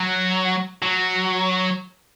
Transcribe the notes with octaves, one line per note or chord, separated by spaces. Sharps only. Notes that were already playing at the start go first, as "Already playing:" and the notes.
Already playing: F#3
F#3